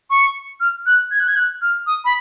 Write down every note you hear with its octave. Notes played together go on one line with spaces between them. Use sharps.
C#6
F6
F#6
G#6
F#6
G#6
F#6
F6
D#6
B5